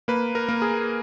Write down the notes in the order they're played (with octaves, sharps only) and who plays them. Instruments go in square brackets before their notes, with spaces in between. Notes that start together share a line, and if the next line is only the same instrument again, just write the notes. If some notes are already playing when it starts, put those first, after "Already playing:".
[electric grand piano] A#3 B4
A#4
A#3
G#4